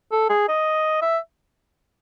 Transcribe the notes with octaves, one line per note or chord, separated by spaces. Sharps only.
A4
G#4
D#5
E5